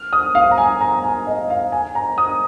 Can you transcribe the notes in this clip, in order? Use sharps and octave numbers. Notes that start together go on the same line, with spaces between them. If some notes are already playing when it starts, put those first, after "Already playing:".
Already playing: F6
D#6
F5
A#5
G#5
A#5
A#5
G#5
D#5
F5
G#5
A#5
D#6